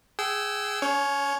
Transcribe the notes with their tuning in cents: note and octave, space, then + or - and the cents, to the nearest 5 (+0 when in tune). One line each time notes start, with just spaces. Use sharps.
G#4 +0 G5 -35 E6 +0
C#4 +30 C#5 +0